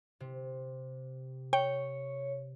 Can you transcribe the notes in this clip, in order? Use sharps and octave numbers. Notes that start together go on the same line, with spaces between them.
C3
C#5 G5